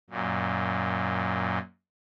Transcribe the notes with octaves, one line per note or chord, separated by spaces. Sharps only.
F#2 A#2